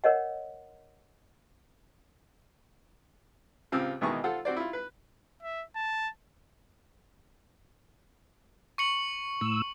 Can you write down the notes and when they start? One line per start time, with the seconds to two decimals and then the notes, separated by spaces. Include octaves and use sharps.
0.04 A#4 C#5 D#5 F#5
3.72 C#2 C#3 C4 F4 G4 E6
4.01 E2 B2 D#3 E3 G#3 C#6
4.24 F4 A4 C5 F#5
4.45 C4 F#4 C5 D5
4.57 E4 F4
4.73 B4
5.42 E5
5.76 A5
8.78 C#6 C#7 F#7
9.41 A2 E6